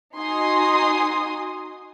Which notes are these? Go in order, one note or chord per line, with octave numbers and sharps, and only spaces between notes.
D#4 F#4 G#5 C6 D#6